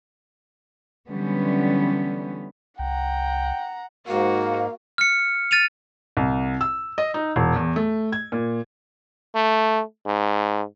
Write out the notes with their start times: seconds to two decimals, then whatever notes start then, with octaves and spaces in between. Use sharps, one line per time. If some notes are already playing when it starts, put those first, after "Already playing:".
1.09 D3 E3 F#3 G3 B3 C#4
2.79 C2 F#5 G5 A#5
4.08 G#2 A#3 F#4 F5
4.98 F6 C#7
5.51 F6 A6 D#7 F7
6.17 C2
6.61 E6
6.98 D#5
7.14 D#4
7.36 E1
7.56 E2
7.76 A3
8.12 G#6
8.32 A#2
9.35 A3
10.06 G#2